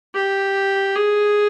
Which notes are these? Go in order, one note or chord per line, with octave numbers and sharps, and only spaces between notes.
G4
G#4